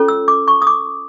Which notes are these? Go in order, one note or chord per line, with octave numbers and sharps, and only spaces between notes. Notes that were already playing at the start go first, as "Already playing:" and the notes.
Already playing: C#4 F4 A4 C#5
E6
D6
C#6
D#6
D6